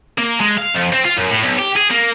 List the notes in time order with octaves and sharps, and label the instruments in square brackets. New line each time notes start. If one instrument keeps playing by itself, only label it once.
[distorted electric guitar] A#3
G#3
F5
F2
C4
F4
F#2
A2
B1
G4
G#4
A#3